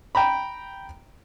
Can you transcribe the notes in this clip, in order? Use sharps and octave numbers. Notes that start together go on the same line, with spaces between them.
G5 A#5 B5